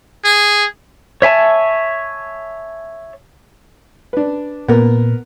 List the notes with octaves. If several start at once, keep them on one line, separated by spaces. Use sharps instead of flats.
G#4
C#5 E5 G#5 A5
D4 B4
A#2 B3 A#4